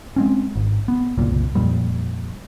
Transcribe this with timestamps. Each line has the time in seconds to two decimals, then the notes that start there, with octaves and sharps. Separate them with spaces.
0.16 G#3 C4 C#4
0.55 G#1
0.88 B3
1.18 F#1 C2 A#2
1.55 F2 A#2 G3